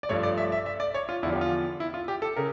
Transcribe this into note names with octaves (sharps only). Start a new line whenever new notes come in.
D5
G2 F3 A3 D4 C#5
D5
E5
E5
E5
D5
C#5
F4
E2 D3 F3 E4
G4
F4
E4
F4
G4
A4
C#3 A#4